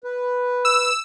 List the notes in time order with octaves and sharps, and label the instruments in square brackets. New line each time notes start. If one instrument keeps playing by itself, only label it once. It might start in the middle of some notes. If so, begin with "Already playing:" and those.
[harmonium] B4
[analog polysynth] E6